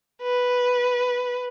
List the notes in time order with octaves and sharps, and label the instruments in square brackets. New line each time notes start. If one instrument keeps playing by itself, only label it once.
[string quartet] B4